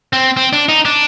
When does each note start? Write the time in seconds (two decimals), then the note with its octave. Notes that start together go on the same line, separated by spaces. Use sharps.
0.13 C4
0.37 C4
0.53 D4
0.69 D#4
0.85 D4